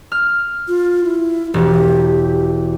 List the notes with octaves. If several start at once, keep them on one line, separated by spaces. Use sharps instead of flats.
F6
F4
E4
E1 G4